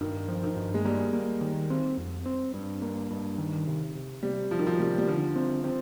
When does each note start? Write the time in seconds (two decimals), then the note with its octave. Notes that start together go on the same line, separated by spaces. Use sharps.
0.01 G2 D#3
0.28 F3
0.43 D#3
0.56 G2
0.74 G#3
0.85 G3 A#3
1.13 A#3
1.41 D#3
1.70 C4
1.98 F2
2.26 C4
2.54 G2
2.82 A#3
3.11 G2
3.38 D#3
3.67 C3
3.95 C3
4.23 C3 G3
4.51 C3 F3
4.59 D#3
4.67 F3
4.79 C3 G3
4.98 G3
5.08 D3 F3
5.36 C4
5.64 C4